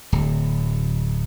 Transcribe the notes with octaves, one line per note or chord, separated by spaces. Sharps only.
D1